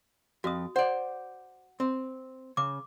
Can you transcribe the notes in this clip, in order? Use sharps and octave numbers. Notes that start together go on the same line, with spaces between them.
F2 F#4 D#6
C5 D5 F#5
C4
C#3 D6